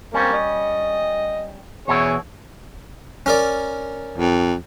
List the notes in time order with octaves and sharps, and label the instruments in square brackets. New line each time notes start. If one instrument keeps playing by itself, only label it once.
[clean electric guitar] G3 C#4 [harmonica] A#3 C4
[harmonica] D#5
[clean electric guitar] E2 B2 E4 [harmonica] G#4 C#5
[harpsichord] C#4 A#4 D5
[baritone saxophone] F2